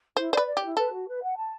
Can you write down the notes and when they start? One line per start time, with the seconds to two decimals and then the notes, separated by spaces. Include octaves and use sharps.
0.17 E4 C5
0.32 C5 D5
0.37 B4
0.47 D5
0.57 G4
0.63 E4
0.77 A4 B4
0.92 F#4
1.07 B4
1.22 F#5
1.37 A5